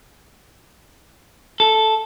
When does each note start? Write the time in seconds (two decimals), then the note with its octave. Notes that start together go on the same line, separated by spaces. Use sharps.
1.60 A4